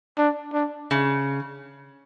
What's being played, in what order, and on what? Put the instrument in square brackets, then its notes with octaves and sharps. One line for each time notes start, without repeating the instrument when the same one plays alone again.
[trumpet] D4
D4
[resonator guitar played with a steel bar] C#3